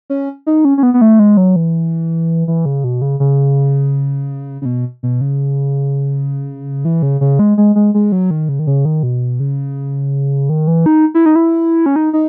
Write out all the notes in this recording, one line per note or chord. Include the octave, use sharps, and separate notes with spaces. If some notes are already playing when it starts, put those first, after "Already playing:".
C#4
D#4
C#4
C#4
B3
B3
A3
G#3
F#3
E3
E3
C#3
B2
C#3
C#3
C#3
B2
B2
C#3
E3
C#3
C#3
G#3
G#3
G#3
G#3
F#3
D#3
C#3
D#3
C#3
D#3
B2
C#3
D#3
E3
D#4
E4
D#4
E4
C#4
D#4
D#4